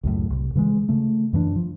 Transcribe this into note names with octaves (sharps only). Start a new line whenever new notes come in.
C#2 F#2 A2
C2
C#3 E3 F#3 G#3
C#3 A3
F#2 E3 B3 D4
F3